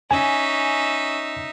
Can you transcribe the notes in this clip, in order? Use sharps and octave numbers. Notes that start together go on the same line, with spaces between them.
C#4 D#4 E5 G#5